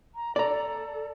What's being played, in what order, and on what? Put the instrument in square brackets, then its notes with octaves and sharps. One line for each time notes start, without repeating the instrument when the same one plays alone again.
[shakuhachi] A#5
[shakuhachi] A4 [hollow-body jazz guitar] D5 A#5